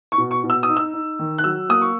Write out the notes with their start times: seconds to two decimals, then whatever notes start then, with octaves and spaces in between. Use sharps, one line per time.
0.12 C#6
0.18 B2
0.31 C#6
0.44 B2
0.50 E6
0.63 D#6
0.69 D#4
0.77 E6
0.94 D#4
1.19 D#3
1.38 F#6
1.44 F#3 E6
1.69 A#3 D#6
1.81 C#6